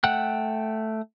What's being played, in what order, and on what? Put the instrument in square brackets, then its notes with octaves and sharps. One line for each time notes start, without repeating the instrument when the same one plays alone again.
[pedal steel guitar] A3 F#5 G5 F#6